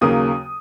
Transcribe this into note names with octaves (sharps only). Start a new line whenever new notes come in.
D#2 C#3 F#3 A#3 D#6